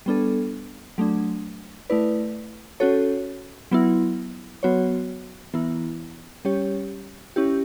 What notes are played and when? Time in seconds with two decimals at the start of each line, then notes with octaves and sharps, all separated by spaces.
0.06 G3 B3 D4 A4
0.98 F#3 A3 D4
1.90 A3 E4 B4 D5
2.80 C#4 F#4 A4 C#5
3.71 F#3 B3 E4
4.63 F#3 B3 F#4 C#5
5.54 E3 B3 E4
6.45 G3 C#4 G4 C#5
7.36 C#4 E4 G4